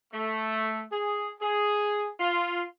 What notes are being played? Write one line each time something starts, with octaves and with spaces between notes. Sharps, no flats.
A3
G#4
G#4
F4